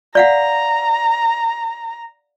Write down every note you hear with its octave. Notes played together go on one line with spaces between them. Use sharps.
D5 F5 F#5 A#5